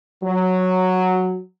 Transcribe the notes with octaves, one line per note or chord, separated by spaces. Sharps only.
F#3